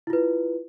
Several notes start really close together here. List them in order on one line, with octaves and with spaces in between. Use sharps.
E4 F4 B4